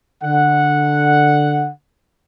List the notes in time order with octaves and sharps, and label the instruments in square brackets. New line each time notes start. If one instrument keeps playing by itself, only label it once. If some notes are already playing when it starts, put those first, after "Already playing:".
[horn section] D3 F#5